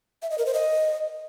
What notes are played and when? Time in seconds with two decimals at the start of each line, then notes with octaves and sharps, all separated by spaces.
0.22 E5
0.30 D#5
0.38 A#4
0.46 C5
0.54 D#5